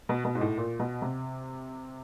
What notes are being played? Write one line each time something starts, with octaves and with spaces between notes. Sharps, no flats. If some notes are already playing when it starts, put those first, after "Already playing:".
B2
B2
G#2
A2
A#2
B2
C3